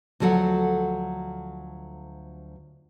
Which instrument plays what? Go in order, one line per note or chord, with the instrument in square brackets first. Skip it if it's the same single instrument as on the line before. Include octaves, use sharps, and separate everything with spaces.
[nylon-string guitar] D2 F3 F#3 A4 F#5